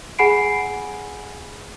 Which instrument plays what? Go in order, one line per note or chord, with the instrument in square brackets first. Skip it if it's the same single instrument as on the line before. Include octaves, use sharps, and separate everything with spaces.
[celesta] G#4 F#5 G#5 B5 C7 D7